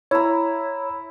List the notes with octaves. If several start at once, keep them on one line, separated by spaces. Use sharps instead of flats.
E4 C#5 A#5